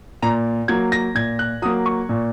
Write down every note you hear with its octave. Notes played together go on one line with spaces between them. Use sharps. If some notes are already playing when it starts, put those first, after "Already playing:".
A#2 A#5
F#3 A#3 G#6
A#6
A#2 G#6
F#6
F#3 A#3 D#6
C#6
A#2